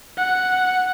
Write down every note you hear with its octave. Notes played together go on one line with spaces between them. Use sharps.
F#5